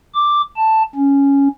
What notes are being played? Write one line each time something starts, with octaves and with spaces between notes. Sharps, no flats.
D6
A5
C#4